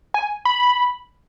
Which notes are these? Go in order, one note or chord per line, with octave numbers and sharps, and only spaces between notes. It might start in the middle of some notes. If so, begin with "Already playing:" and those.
G#5
B5